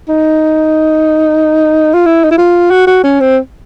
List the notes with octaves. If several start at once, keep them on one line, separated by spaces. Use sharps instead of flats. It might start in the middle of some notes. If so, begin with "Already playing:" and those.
D#4
F4
E4
D#4
E4
F4
F#4
F#4
C#4
C4